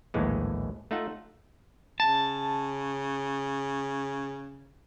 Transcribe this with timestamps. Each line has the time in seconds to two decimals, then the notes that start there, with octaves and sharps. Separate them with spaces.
0.14 A#1 D#2 A2 E3 G#3
0.91 A3 D#4 F4 E5 F#5
2.00 C#3 A5